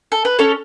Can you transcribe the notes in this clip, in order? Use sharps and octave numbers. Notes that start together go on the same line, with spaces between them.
A4
B4
C#4 A4 C#5